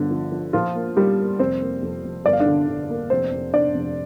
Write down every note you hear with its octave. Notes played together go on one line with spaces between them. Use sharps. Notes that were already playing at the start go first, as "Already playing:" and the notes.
Already playing: G1 D3 F3 D4
F3
F3
A#2 F3 F4
A#3
G3 A#3 G4
A#3
F1 C4 C5
A#3
F2
F1
G1 D5
F5
D4 D5
D3
D3
A#3
F1 C4 C5
F1
F1 D4 D5
F1